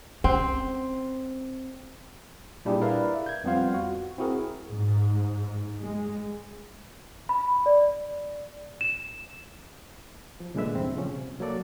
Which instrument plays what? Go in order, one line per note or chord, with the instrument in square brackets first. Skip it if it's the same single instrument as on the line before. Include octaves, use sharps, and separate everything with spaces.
[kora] C4 [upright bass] C#4
[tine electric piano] A#2 G3 D4 E4 G4 G#4
E4 A#4 B4 D5 E5 F5
G6 G#6
F2 G3 B3 C4 F4 F5
F#4
C4 E4 F#4 G#4 A#4
[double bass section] G#2
G#3
[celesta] B5
D5
E7
[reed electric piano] F3
C2 A#2 D3 G#3 B4 E5
E2 G2 C4
A#2 C#3 F3 C#4
C2 C3
F#3 A#3 A4 D5